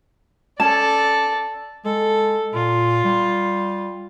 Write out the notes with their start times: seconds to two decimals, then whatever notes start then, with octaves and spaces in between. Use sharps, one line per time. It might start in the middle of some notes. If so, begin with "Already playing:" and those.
0.60 C#4 A4 D5 A5
1.85 G#3 A4
2.54 A#2 F4
3.04 G3